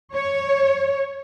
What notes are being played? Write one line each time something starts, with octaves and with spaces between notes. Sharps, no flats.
C#5